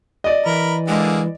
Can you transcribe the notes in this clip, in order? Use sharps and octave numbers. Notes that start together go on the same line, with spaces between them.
D5 D#5
E3 A#4 B5
D3 G#3 A#3 G#4